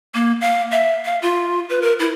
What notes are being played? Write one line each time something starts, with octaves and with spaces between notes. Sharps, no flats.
A#3
F5
E5
F5
F4
B4
A#4
E4